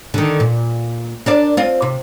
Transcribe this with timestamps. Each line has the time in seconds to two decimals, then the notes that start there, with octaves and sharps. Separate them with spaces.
0.14 D3 D#3
0.40 A#2
1.26 D4 A#4 D5
1.57 C4 F4
1.82 C3